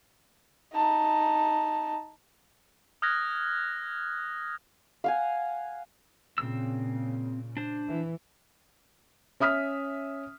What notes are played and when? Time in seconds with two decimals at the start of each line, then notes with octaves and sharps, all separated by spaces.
0.74 D#4 A5
3.02 D#6 F6 F#6 G#6 A#6
5.04 F5 F#5 G#5
6.38 A#2 C#3 C4 E6
7.57 D4 C5
7.88 E3
9.40 C#4 E5 D#6 F6 B6